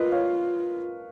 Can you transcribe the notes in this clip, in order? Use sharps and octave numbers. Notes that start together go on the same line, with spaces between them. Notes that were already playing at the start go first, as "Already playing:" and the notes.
Already playing: F4 A#4 B4 D#5
C#5 F5